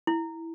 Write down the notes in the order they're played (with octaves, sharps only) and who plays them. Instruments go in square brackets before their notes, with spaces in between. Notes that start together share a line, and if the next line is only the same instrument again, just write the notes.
[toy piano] E4